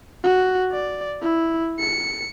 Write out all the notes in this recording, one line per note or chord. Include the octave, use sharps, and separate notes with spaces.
F#4
D5
E4
C#7